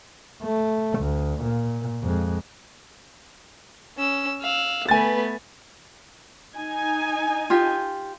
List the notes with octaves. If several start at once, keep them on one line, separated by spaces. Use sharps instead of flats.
A3
D2
A#2
F2 G#3
C#4 E6
F5 E6 F#6
A3 B3 B4 G#5 A6
D#4 G#5
F4 G4